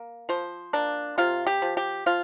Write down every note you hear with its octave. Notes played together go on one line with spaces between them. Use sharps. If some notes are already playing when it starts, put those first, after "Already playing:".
Already playing: A#3
F3 C5
A#3 D4
C3 F4
G4
F3
G4
F3 F4